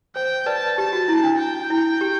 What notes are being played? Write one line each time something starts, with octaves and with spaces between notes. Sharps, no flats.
C5 G5
B4 D5 A5
G4 A5
F#4
E4
D4
G5
E4
G4